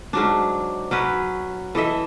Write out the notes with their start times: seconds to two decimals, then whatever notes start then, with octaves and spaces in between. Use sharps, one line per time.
0.13 G#2 F#3 D4
0.91 F#3 C#4 B4
1.75 E3 A4 D#5 E5